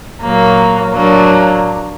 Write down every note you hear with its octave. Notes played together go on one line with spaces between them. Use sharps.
A#2 F#3 A#3
A2 F#3 A#3 D4